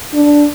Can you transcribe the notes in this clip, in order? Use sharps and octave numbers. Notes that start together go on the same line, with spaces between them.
D4